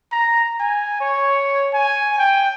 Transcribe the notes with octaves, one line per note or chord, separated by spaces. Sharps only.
A#5
G#5
C#5
G#5
G5